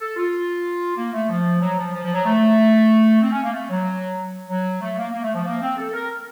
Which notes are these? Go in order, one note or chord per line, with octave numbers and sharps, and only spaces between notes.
A4
F4
A#3
A3
F3
F#3
F3
F3
F3
F#3
A3
C4
C#4
A#3
A3
F#3
F#3
A3
A#3
A#3
A3
F3
A#3
C4
A4
A#4